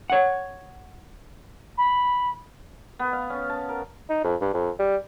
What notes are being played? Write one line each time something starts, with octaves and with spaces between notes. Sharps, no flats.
C#5 F#5
B5
B3
F5
C#4
A5
A#4
D#4
F2
G2
F2
G3